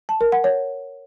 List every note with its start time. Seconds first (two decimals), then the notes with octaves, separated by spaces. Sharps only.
0.09 A5
0.21 A#4
0.32 F#5
0.44 C#5